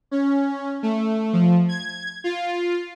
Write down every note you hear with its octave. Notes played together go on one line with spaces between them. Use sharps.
C#4
A3
F3
G#6
F4